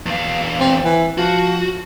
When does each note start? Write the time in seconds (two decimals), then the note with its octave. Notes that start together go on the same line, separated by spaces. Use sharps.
0.06 E2 F5
0.60 C4
0.85 E3
1.18 F3 F#4